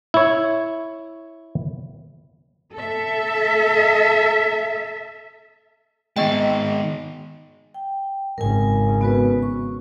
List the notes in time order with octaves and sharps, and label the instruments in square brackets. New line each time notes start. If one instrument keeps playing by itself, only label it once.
[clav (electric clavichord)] E4 C#5
[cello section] A4 E5
[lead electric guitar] D#3 G#3 [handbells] B3 D#5 G5
[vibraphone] G5
[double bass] G#1 C#3 [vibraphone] A#4 G#5
[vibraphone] B3 F#4 B4
C#6